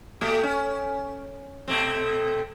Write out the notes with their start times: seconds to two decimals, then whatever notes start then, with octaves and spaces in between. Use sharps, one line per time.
0.21 A#2 A3 G4
0.43 C#4
1.68 B2 A3 C4